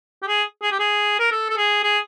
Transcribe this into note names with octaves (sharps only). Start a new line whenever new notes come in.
G4
G#4
G#4
G4
G#4
A#4
A4
A4
G#4
G#4